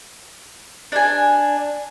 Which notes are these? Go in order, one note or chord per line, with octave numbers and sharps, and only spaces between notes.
D4 G#5